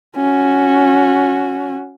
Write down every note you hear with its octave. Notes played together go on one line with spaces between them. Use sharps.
C#4 F#4